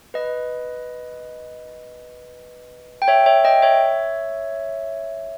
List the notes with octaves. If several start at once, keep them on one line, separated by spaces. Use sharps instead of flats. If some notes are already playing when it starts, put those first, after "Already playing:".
B4 D#5
G5
C#5 E5
C#5 E5
D#5 G5
C#5 E5